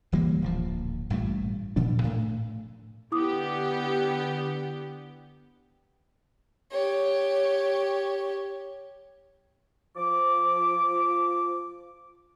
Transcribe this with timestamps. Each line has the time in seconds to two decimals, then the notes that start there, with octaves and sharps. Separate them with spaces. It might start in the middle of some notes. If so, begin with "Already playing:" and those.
0.12 E1 E3 G3 A#3
0.42 D1 A#1 F3
1.10 A1 G2 A#2 A3
1.76 E1 A#2 F3 D4
2.03 A2 A3
3.12 D3 B3 E4 G4 D6 D#6
6.71 G4 C#5
9.96 F3 D6